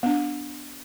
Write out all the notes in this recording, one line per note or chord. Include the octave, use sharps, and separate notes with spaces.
B3 D4